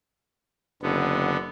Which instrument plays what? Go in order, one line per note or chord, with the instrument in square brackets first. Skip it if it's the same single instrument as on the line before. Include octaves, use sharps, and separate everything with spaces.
[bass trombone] F#1 [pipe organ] D3 B3